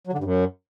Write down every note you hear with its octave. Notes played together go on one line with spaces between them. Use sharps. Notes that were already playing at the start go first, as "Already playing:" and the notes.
F#3
D3
G2
F#2